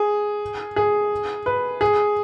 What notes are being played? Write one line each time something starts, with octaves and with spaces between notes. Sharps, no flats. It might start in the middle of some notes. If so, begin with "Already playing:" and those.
Already playing: G#4
G#4
B4
G#4